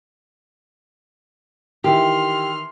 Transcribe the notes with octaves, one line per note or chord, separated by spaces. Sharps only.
D#3 E3 G4 C6 F6